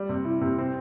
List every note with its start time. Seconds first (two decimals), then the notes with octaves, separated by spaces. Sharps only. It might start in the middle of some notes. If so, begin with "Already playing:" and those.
Already playing: G3
0.09 C3
0.25 E4
0.41 C3
0.58 C4